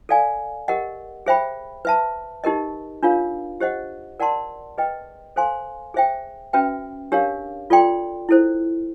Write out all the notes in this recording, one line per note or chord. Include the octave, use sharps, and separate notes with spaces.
A4 D5 F5 G#5
G4 A#4 D#5 F#5
G#4 C5 E5 G5 B5
B4 E5 A5
D#4 G4 A#4 D#5
D4 F4 A#4 C#5 F5
G4 C5 D#5 F#5
A#4 D5 F#5 A5 C6
G#4 B4 D#5 G5
A4 C5 F5 G#5 C6
G#4 C5 E5 G5
C#4 F#4 B4 E5 G5
D4 G4 A#4 C#5 F5
F4 A4 D5 G5 C6
E4 A4 C5